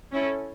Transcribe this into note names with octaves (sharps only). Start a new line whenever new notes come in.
C#4 E4 A4